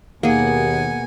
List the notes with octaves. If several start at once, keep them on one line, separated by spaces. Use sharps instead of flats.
D#2 B2 A#3 G#4 F#5 G#5